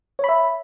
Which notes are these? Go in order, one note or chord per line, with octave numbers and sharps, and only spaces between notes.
C#5 E5 B5